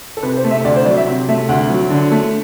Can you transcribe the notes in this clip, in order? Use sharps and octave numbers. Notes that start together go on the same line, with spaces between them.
A4
C3 B4
C5
A3
E5
D2 D5
C5
F#3 D5
E5
C3
A3 E5
D2 F#5
F#3
D3
A3